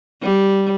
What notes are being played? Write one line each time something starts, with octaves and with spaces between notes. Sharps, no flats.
G3